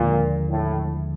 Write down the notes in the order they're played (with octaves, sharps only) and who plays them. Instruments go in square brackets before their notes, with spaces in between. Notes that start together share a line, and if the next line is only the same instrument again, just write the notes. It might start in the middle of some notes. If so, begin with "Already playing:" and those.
Already playing: [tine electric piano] D#2 D3 F3 G#3 [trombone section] A#2
[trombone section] A2